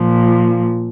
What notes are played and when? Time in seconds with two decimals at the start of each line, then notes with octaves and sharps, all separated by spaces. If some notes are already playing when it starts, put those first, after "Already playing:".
Already playing: A#2 F3